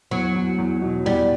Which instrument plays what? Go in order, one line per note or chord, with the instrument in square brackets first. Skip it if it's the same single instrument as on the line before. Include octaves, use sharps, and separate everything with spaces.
[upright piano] E2 [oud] F#3
[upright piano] E2
E2
B2
[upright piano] E2 [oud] G3